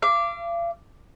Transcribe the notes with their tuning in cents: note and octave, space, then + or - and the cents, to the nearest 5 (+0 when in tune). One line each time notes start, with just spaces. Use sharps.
F5 -40 D6 +0